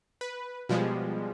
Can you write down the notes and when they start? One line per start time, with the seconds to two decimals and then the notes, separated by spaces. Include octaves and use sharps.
0.21 B4
0.69 B2 F3 G3 G#3